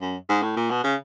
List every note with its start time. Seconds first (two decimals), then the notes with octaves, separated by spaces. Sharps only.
0.01 F#2
0.29 G#2
0.43 A2
0.56 A#2
0.70 B2
0.84 C#3